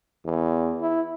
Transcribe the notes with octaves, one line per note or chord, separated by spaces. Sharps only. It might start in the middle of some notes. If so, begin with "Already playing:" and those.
E2
E4